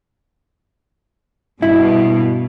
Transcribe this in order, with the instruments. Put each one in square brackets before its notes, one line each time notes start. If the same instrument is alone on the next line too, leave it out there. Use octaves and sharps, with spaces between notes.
[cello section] G2 B2 [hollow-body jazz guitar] E4